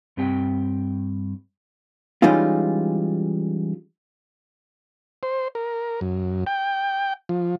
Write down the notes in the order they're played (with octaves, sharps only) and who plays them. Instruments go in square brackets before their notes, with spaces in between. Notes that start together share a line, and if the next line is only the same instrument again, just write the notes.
[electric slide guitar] G2 C4 G4 G5
[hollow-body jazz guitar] E3 G3 G#3 C#4 D#4 F4
[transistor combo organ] C5
A#4
F#2
G5
F3